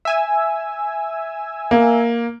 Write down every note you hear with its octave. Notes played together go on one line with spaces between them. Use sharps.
E5 G#5 E6
A#3